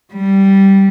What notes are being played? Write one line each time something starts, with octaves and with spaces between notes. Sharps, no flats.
G3